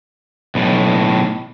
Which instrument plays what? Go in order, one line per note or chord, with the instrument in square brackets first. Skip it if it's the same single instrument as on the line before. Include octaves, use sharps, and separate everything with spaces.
[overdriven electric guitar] B1 A2